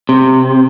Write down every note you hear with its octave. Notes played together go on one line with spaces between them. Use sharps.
C3